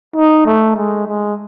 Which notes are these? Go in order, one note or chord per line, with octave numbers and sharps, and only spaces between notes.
D#4
A3
G#3
G#3